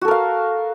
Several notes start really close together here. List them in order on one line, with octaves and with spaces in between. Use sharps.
F#4 A4 A#4 F5